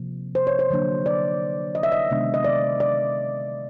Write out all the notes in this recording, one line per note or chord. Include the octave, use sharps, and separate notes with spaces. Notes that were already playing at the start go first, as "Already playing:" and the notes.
Already playing: C3 F3 A#3
C5
C#5
C5
D3 F#3 A#3 D4
D5
D#5
E5
D#5
C3 D#3 G#3 B3 D4
D#5
D5
D5